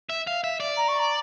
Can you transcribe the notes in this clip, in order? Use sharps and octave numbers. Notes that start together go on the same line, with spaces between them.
E5
F5
E5
D5
A#5
C#6
A#5